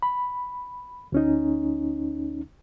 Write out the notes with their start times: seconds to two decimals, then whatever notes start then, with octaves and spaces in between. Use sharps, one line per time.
0.02 B5
1.12 D2 C#4 D#4